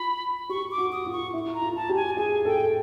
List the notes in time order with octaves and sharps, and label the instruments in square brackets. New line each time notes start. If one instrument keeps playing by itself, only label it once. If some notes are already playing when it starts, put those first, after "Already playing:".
Already playing: [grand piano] F4 [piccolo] B5
[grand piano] G4 [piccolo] C#6
[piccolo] D6
[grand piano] F#4
[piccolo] D#6
[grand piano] F4
[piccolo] C#6
[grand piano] E4
[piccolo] A#5
[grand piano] F4
[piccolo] A5
[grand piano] G4
[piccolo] G#5
[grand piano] G#4 [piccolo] G#5
[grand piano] A4 [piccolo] G5